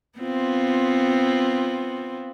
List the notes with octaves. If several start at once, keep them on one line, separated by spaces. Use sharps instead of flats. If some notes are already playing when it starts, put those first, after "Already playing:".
B3 C4 F4